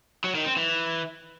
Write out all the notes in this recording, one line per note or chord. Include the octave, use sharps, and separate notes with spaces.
F#3
D#3
C4
E3